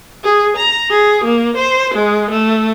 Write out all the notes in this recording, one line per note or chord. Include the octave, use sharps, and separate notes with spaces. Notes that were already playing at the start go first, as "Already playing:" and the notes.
G#4
A#5
G#4
A#3
C5
G#3
A3